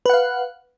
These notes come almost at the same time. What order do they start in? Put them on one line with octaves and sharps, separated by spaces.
B4 F#5 F5